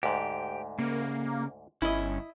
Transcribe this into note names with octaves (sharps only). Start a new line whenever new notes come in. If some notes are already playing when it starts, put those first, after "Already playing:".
D2 G#2 G4
C#3 A#3
G1 C#4 E4 D#5